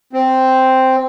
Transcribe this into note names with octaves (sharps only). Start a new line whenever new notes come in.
C4